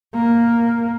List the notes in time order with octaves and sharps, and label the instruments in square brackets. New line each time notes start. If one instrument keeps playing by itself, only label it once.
[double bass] A#3